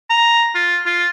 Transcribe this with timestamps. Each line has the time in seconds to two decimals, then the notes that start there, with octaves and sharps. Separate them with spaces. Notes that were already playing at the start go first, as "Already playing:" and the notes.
0.10 A#5
0.55 F4
0.86 F4